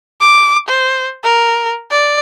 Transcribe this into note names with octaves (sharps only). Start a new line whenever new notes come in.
D6
C5
A#4
D5